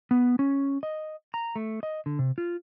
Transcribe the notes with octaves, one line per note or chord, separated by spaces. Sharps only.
B3
C#4
D#5
A#5
A3
D#5
D3
C3
F4